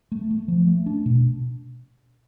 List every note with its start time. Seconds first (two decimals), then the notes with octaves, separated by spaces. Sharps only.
0.12 A3
0.31 A3
0.48 F3
0.67 A3
0.86 D4
1.06 B2